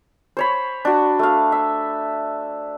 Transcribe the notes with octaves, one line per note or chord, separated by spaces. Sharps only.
C5 C#5 B5
D4 F#4
A3 F5
E5